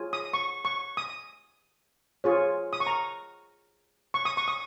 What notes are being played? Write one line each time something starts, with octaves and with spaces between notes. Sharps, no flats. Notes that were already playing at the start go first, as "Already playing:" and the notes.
Already playing: F4 G#4 C#5
D#6
C#6
C#6
D#6
F4 G#4 C#5
D#6
C#6
A#5
C#6
D#6
C#6
D#6